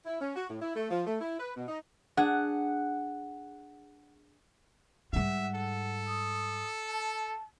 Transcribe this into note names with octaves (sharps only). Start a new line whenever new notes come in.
E4
C#4
F#4
A2
E4
A3
F3
A3
E4
B4
B2
D#4
D4 G#4 F#5
G#2 G3 E5 F#5
A4
D#6
A5